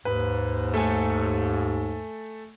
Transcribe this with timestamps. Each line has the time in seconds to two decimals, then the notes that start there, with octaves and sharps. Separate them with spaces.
0.05 D#2 G#2 B4
0.74 A3 A4 G#5